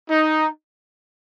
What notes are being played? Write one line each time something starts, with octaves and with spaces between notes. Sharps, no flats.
D#4